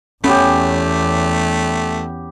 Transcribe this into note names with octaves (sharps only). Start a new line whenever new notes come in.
E2 A3 B3 C#4 G4